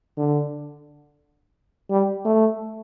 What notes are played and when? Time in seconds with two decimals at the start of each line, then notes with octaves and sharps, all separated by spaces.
0.17 D3
1.90 G3
2.25 A3